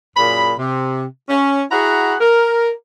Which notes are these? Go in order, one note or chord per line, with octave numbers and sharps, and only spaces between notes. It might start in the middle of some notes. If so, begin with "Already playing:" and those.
F#2 A#2 G#4 B5
C3
C#4
E4 F#4 G#4 F#5 A#5 B5
A#4